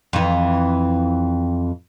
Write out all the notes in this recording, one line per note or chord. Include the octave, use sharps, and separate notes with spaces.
F2 E3